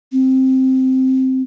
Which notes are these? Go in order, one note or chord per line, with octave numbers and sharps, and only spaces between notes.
C4